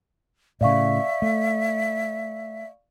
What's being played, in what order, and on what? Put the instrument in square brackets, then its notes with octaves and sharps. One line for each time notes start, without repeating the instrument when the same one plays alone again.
[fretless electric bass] A2 C#3 [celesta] D5 F5 C#6 [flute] E5
[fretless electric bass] A3